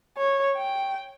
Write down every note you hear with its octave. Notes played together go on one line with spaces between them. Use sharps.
C#5
G5